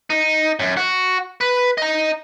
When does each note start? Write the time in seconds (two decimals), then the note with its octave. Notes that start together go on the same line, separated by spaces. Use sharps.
0.10 D#4
0.59 F#2
0.77 F#4
1.41 B4
1.78 D#5 A#5